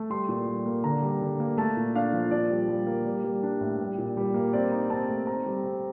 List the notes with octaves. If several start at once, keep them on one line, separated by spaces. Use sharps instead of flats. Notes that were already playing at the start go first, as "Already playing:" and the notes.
Already playing: A3
G3 C6
A#2
G3
A#3
D3 A#5
G3
D3
A#3
A3 A5
A#2
D4 F5
F3
A#2 D5
G3
G3
A#3
G3
G3
D4
A2
G3
A#2
G3
A#3
C4 D5
D#4
C4 A5
A3
C4 A#5
G3
C4